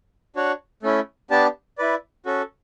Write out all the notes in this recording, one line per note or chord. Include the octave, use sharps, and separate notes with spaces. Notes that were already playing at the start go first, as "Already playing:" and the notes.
D4 F#4 C#5 F#5
A3 C#4 E4
B3 D4 G4 D5 A5
E4 B4 D5
C#4 F#4 A4